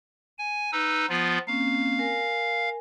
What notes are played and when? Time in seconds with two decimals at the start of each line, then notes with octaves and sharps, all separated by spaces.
0.38 G#5
0.72 D#4 B4 E6
1.09 F3 B3 F4
1.47 A#3 C4 C#4 F5
1.99 A#4 G#5